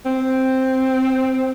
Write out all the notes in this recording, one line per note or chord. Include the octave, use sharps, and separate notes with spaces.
C4